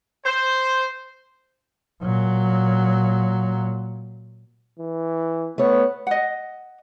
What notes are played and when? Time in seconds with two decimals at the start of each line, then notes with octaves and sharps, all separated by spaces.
0.24 C5
2.03 A#2 F#3
4.79 E3
5.58 A3 B3 C#5
6.07 D#5 F#5